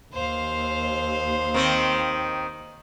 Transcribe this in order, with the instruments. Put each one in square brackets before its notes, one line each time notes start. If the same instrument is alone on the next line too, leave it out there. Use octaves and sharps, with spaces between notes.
[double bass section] D#2 [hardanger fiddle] C5 F5
[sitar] D#3 C4